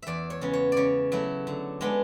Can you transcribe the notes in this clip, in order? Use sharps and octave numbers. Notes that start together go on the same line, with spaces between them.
E2 D5 E5
C#5
C#3 G#3 B3
C#5
C#3 C#5 D5
F#3 A3 E4
D3
G#3 B3 D4